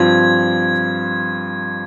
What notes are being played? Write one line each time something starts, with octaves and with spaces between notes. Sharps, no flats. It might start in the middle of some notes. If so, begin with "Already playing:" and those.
Already playing: G2 F3 C4 G#6